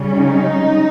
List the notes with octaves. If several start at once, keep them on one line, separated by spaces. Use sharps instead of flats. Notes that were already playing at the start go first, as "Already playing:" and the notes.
Already playing: C#3 G3 C#4
D#4